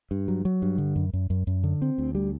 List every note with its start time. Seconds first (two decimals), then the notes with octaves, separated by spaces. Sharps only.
0.11 G2
0.28 F#3
0.45 F#3
0.62 G2
0.78 D3
0.96 F#2
1.13 F#2
1.30 F#2
1.47 F#2
1.63 D3
1.82 C4
1.98 D2
2.15 G3